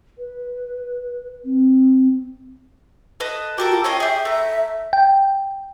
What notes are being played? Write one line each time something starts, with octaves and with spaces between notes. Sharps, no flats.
B4
C4
A4 B4 D#5
F#4 G4 A4 A#4
F4
C#4 F4 D#5 G5
G4 G#4 E5
A3 A#5
G5